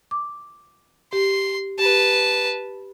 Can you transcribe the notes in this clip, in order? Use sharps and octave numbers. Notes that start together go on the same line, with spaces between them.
D6
G4 C6
G4 B4 A5